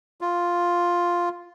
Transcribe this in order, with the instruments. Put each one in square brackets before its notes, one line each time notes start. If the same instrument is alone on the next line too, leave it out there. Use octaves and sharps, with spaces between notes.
[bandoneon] F4